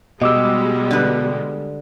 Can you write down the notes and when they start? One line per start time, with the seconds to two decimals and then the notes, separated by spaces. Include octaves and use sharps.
0.22 B2 G3 G#3 D#5 D6 E6
0.90 D3 B4